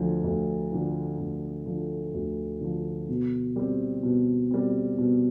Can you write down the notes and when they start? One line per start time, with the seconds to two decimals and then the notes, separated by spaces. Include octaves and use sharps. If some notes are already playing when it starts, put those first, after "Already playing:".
Already playing: D2 D3 F3
0.24 D2
0.72 D3 F3
1.19 D2
1.66 D3 F3
2.14 D2
2.61 D3 F3
3.09 B2
3.56 G3 C4
4.03 B2
4.51 G3 C4
4.98 B2